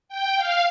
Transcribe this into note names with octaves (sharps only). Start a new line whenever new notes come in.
G5
F5